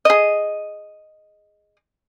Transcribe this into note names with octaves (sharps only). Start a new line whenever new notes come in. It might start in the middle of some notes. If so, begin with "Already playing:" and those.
G#4 D#5